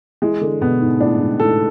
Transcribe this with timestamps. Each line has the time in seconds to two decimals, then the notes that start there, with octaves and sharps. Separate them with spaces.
0.22 E3 G#3
0.41 D3
0.61 B2 B3
0.81 G#2
1.00 A2 D4
1.20 G#2
1.40 A2 A4